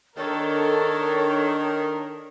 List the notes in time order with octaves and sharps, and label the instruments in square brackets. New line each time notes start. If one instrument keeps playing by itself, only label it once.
[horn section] D#3 [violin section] D4 A#4 [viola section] A4 [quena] C#5